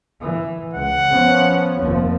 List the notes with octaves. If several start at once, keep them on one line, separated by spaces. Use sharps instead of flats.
E3
C#2 F#5
F3 B3 C#4
F1 D#2 F3